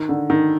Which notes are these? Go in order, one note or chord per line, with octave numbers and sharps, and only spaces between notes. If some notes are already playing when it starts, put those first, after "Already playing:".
Already playing: D#3
D3
D#3